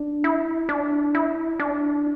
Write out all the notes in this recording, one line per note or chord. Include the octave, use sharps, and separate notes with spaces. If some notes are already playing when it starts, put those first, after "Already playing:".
Already playing: D4
E4
D4
E4
D4